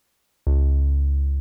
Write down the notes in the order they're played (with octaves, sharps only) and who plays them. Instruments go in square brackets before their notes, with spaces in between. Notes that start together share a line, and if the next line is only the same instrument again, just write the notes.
[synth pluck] C#2